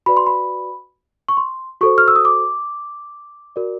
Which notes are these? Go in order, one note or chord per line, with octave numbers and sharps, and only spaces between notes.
F#4 B4 D5 B5
C6
B5
C#6
C6
F#4 A4 C5 C#6
F6
E6
D#6
D6
F#4 A#4 D5